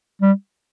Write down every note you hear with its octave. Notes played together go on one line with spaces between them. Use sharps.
G3